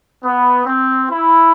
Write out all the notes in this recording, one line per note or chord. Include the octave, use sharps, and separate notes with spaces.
B3
C4
E4